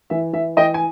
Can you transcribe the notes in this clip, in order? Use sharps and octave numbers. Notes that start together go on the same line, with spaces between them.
E3 E5
E3 E5
E3 D#5 G5
G#5